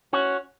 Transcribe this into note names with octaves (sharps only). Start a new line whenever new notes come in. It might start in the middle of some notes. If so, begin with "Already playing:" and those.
C#4 F#4